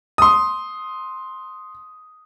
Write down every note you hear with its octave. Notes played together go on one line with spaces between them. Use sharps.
C6 D#6